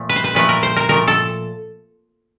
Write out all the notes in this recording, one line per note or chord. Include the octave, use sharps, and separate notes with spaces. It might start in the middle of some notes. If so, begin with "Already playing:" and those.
Already playing: A#2 F3 A3
B4
C5
B4
A#2 F3 A3 B4
A#4
C5
A#4
A#2 F3 A3 A#4
A4